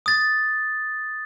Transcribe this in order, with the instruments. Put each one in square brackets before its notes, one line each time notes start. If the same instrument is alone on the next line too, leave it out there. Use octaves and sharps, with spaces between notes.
[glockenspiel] D#6 A6